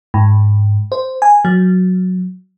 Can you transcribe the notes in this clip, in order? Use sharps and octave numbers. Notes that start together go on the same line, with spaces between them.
G#2
C5
G#5
F#3